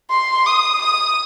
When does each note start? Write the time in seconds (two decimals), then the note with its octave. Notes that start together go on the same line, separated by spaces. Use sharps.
0.10 C6
0.46 D#6
0.82 D#6